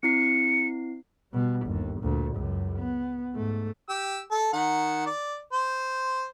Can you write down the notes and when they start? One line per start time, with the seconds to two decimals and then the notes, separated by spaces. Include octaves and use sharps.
0.03 C4 E4 C7 C#7
1.32 B2 G3
1.66 G1 D#2
2.01 D2 A#2
2.37 C#2 F#2
2.79 B3
3.33 G#2 A3
3.89 G4 E6
4.31 A4
4.53 D#3 F#5
5.06 D5
5.52 C5